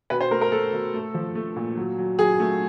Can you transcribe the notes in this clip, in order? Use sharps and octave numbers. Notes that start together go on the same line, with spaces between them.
B2 B4
C5
A3 A#4
A#4
A3 A4
B2
A3
F3
A3
A#2
F#3
F#3
F#3 G#4
A3